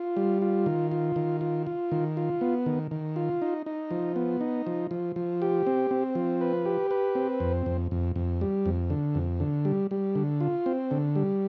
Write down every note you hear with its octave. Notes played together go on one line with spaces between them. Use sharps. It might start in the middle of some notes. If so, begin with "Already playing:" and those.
Already playing: F4
G3
F4
D#3
F4
D#3
F4
F4
D#3
F4
B3
D#3
D#3
F4
D#4
D#4
F3
B3
D#4
F3
F3
F3
G4
C4
C4
F3
B4
G4
B4
C4
F2
F2
F2
F2
G3
F2
D3
F2
D3
G3
G3
D3
F4
C4
D3
G3